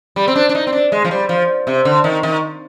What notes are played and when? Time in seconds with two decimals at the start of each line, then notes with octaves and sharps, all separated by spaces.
0.16 G3
0.28 C4
0.35 D4
0.49 D4
0.55 D#4
0.67 C4
0.73 D4
0.92 G#3
1.05 F3
1.11 G3
1.29 F3
1.67 C3
1.85 D3
2.04 D#3
2.23 D#3